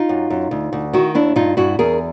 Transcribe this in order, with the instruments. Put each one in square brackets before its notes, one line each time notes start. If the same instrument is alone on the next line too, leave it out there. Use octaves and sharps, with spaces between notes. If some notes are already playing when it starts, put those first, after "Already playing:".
Already playing: [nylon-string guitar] D#4 F4
F#2
F#2
D2
D2
D#3 E4 F#4
D#2 D4 E4
G2 D#4 F4
G2 E4 F#4
E2 G#4 A#4